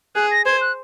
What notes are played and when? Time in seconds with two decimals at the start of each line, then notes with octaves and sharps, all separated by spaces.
0.15 G#4 F#6
0.31 A#6
0.46 C5 G#6
0.61 F#6